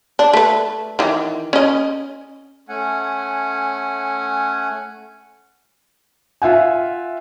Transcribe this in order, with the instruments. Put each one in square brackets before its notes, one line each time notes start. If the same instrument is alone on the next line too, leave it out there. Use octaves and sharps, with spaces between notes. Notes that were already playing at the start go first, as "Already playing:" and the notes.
[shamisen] D4
A3 B4
D#3 E3
C#4 D#5
[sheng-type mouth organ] A3 C#4 F#5 G#5
[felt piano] F4 E5 F#5 G#5